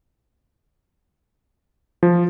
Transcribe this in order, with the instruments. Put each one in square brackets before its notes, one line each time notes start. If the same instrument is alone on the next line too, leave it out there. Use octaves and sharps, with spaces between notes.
[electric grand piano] F3